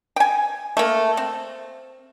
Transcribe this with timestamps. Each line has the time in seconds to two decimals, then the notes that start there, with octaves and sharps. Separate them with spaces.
0.16 G5 G#5
0.77 A3 A#3
1.17 C4